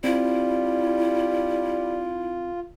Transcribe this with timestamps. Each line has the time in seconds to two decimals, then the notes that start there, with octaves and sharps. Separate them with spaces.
0.04 G3 C4 E4 F4